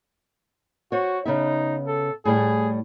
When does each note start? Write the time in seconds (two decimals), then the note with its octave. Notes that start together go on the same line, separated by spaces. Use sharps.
0.92 F#4 C5 C#5
1.25 C#3 B3 D#4 E5
1.86 A4
2.25 A2 G3 A3 G#4